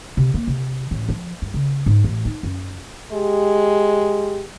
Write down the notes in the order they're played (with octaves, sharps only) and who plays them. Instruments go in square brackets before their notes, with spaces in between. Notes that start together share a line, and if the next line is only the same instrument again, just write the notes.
[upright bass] C3
A#3
C3
A1
F3
G2
C#3
G#2
A1
D#4
F#2
[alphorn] G#3 [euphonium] G4